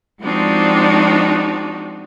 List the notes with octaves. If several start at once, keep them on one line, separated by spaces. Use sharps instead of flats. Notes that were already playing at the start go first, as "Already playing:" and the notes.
F3 G#3 C4 D4 D#4 F#4